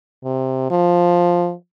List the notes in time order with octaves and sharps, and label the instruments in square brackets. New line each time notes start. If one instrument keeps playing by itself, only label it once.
[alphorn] C3
F3